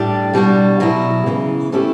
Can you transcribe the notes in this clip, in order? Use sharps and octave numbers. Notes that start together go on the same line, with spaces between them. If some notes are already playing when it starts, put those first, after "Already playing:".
Already playing: A2 G3 D4 G4
B2 G3 D4 F#4
B2 F#3 B3 E4
C#3 E3 B3
E3 A3 C#4 E4 G4